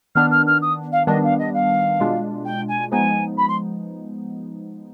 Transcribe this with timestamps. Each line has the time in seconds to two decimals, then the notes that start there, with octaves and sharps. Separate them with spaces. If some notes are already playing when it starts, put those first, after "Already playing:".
0.15 D#3 B3 D4 F6
0.31 F6
0.47 F6
0.62 D#6
0.92 F5
1.07 D#3 G3 B3 D4 D#5
1.23 F5
1.39 D#5
1.54 F5
2.00 B2 G#3 D4 F4
2.45 G5
2.69 G#5
2.91 F3 G#3 B3 D#4 G#5
3.38 B5
3.48 C6